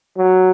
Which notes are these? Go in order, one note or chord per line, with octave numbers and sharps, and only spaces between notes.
F#3